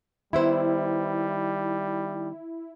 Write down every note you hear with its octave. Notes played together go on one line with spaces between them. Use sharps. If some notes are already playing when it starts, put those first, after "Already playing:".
D#3 G3 B3 E4 C5